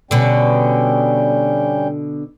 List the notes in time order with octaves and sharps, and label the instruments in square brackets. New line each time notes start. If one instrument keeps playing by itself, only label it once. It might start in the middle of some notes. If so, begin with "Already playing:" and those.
[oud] B2 D3 [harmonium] G3 C#4 G5